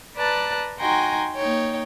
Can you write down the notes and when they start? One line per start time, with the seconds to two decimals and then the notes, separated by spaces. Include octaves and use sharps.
0.17 B4 D5 A5 A#5 F#6
0.79 D#4 F#4 G5 G#5 A#5 C6
1.36 A#3 D#4 C#5 G5